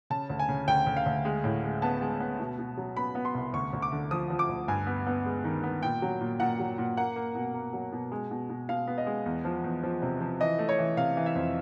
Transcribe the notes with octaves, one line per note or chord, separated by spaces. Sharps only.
C#3 A5
D2
G#5
C#3
D2 G5
D2
F5
D2
G#3
A2
G#3
B3 A5
G#3
B3
B2
B2
F#3
B3 B5
B3
C6
C2
D2 C#6
D2
D6
D3
F3 D#6
F3
D6
D2
G2 G#5
B3
B3
G#3
D#3
B3
A#2 G5
F#3
A#2
A#2 F#5
F#3
A#2
A#3 F#5
A#3
B2
A#3
F#3
B2
G#3
B2
B2
B2 F5
B3
D#5
G#3
E2
F3
E2
F3
C3
F3
E3 D#5
A3
C#5
E3
C3 F5
E3
E5
F2